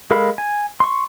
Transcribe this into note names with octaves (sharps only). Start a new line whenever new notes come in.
G#3 A4 A#4 F5 B5
G#5
C6 C#6